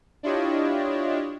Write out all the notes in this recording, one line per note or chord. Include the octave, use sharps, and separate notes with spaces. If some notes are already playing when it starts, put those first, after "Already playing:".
D4 E4 F4 G4 C#5 D#5